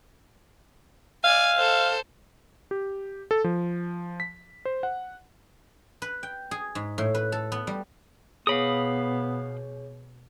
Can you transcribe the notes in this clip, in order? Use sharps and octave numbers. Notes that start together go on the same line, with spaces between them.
D5 F5 G#5
A4 C5
G4
A4
F3
B6
C5
F#5
B4
G5
G#4
G#2
A2
B4
A4
B3
G3
B2 B3 G#4 C#5 F5 B5 D#6